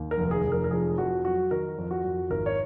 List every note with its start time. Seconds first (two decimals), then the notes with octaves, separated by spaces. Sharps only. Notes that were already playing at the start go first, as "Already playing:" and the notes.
Already playing: D#2
0.11 A#4
0.18 F1
0.31 G#4
0.44 F1
0.52 A#4
0.64 A#4
0.71 F2 G#4
0.98 F2 F#4
1.24 F#3 F#4
1.51 D#3 A#4
1.78 F2
1.91 F#4
2.05 F2
2.30 G#1 A#4
2.46 C#5